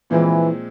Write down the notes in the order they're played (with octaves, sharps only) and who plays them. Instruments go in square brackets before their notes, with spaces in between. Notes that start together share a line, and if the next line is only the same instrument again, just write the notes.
[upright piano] A#2 F3 G#3 C4 [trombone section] E3